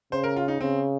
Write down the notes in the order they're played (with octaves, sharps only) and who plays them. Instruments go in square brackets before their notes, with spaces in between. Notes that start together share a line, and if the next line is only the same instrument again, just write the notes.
[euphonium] C#3 [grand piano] C5
[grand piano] A#4
F4
D#4
[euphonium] C#3 [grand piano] C4